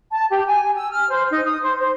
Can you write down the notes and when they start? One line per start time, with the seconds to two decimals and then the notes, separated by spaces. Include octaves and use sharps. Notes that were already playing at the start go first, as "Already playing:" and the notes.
0.12 A5
0.30 G4
0.47 G#5
0.75 E6
0.91 F6
1.11 C5
1.30 D#4
1.45 D#6
1.62 C5
1.80 C5